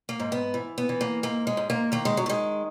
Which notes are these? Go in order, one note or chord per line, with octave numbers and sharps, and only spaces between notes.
A#3
G#2
B3
E3
B3
E3
A#3
G#2 A#3
G#3
G#2
A#3
D#3 A#3
G#3
F#3
D#3 G#3